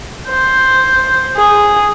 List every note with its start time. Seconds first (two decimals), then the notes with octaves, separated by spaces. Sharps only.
0.28 C5
1.36 G#4